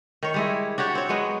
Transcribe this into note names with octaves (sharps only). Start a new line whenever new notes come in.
D#3 C#5
G3 G#3 E4
D4 F#4 G4 C#5
C4 C#5
F#3 G#3 B3